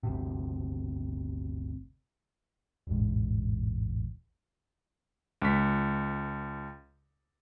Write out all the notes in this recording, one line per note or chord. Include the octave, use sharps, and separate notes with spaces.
G1 D2 C3
E1 A1 G#2
C#2 B6